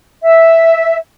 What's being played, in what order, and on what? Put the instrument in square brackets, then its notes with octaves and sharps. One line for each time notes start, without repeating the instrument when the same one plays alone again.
[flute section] E5